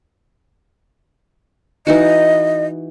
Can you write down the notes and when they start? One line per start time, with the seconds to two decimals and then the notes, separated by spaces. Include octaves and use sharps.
1.87 E3 D#4 F#4 D#5